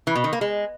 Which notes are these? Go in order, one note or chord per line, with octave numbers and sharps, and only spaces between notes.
E3
B2
D#3
A#3
G#3